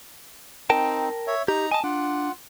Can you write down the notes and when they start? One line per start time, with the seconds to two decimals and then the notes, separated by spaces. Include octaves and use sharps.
0.70 C4 D#4 A#4 G5 A5
1.27 C#5 E5
1.48 D#4 G4 A#5
1.72 D#5 G#5 A5
1.84 D4 F4 F#5